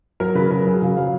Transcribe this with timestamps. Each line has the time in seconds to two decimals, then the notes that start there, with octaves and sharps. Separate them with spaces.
0.20 F#3 A#4
0.35 C#3 B4
0.51 F#3 A#4
0.66 F#3 G#4
0.82 C#3 F5
0.97 F#3 F5